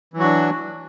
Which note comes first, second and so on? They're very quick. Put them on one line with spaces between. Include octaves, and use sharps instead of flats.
E3 F#3 F#4 D4